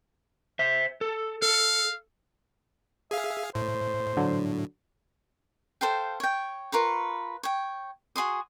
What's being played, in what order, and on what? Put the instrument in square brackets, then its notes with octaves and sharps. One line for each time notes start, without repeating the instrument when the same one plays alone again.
[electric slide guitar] C5 E5
A4
[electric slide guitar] A4 [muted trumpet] F5
[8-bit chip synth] G#4 F5 [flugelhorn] E5
[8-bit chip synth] A2 [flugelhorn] C5
[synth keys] D3 F#3
[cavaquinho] A4 C5 F5 G5
C#5 G5
F4 A#4 B4 C#6
C#5 G5
F#4 G#4 C6 D#6